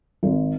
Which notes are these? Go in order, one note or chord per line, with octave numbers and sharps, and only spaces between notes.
G#1